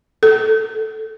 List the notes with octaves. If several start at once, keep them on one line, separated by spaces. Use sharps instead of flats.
A4